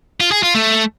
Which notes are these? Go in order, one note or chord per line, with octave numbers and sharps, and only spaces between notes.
F4
G#4
F4
A3